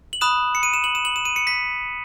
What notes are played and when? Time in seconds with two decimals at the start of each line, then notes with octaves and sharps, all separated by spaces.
0.13 F#7
0.21 B5 D#6 F#6 E7
0.55 C#7
0.63 D#7
0.73 E7
0.84 F#7
0.95 E7
1.05 F#7
1.16 E7
1.25 D#7
1.36 C#7
1.47 B6